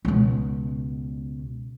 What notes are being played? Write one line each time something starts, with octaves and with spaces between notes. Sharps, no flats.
C#2 B2